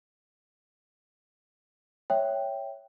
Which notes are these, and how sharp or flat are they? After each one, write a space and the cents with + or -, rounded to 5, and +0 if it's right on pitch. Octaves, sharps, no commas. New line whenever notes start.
C#5 +0 E5 +0 G5 +0